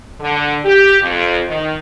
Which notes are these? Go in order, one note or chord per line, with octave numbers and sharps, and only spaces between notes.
D3
G4
F2
D#3